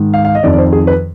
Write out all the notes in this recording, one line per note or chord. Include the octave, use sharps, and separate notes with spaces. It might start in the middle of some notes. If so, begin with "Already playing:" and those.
Already playing: G#2 D#3
F5
F5
D#5
F2 D#3 D5
D5
C5
G#4
B4